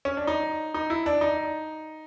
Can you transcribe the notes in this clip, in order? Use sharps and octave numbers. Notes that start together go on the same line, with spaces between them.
C#4
D4
D#4
D#4
E4
D4
D#4